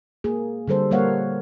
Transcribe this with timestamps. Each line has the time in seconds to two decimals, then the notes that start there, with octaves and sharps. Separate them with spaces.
0.24 A#3 G#4
0.68 D3 G3 A4 C5
0.91 G3 A#3 C#5 F5 F#5